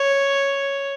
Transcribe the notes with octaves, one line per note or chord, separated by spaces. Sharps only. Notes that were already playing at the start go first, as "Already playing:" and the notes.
Already playing: C#5